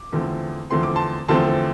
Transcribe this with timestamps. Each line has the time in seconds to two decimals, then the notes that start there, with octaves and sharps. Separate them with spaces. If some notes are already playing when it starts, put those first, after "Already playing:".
Already playing: D6
0.12 E2 D3 F3 A3 C4
0.70 E2 D3 F3 A3 C4 C6
0.83 D6
0.96 A5 C6
1.28 E2 D3 F3 A3 C4 A5 C6